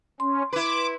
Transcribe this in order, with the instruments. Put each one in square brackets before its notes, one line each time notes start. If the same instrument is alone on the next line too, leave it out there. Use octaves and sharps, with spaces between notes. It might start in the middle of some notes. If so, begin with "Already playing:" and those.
[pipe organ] C#4 [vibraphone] C6
[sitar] E4 B4 [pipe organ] D6